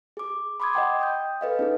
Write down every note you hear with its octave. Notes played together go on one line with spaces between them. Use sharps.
G#4 D6
B5 C6 D6 D#6 G#6
D#5 F#5 G5 C6
G5 D#6 G6
A4 B4 D#5 F5
C#4 D#4 G#4